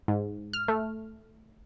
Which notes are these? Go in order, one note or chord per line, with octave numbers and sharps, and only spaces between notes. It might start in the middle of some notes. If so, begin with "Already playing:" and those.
G#2
F6
A3